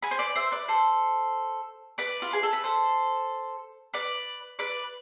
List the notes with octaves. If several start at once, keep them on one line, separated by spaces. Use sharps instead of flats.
G#5 B5
C5
B4 D5
C5 E5
B4 D5
A4 C5
B4 D5
F4
G#4
A4
B4
A4 C5
B4 D5
B4 D5